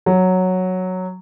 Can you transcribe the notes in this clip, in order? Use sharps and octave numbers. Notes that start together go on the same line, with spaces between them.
F#3